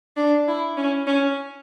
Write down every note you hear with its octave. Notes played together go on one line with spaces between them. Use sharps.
D4
E4
C#4
C#4